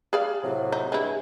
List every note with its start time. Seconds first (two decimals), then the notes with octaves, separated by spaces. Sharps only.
0.13 G#4 D5 F5
0.43 A2 C3 F#3
0.72 D#4
0.92 G2 G#3 E4